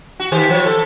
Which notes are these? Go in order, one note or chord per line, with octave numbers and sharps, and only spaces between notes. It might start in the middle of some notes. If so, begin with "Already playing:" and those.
F#4
D#3 G4 C5
F3 C#5
A4